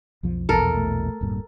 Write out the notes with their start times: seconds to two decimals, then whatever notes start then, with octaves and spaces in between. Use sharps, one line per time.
0.23 B1 F2 F3
0.49 A#1 E2 B2 A4 A#4
0.77 A3
1.21 D1 G2 A#2